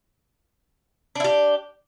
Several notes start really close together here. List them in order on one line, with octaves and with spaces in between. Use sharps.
D4 E4 G4